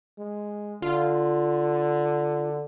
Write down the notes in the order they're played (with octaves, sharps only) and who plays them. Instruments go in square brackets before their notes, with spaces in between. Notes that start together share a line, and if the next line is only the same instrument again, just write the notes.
[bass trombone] G#3
[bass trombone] D3 [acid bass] F4